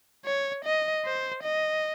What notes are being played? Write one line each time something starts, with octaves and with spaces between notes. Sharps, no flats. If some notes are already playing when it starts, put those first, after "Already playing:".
C#5
D#5
C5
D#5